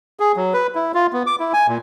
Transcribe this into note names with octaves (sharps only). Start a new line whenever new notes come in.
G#4
F#3
B4
E4
F4
B3
D6
E4
G#5
A#2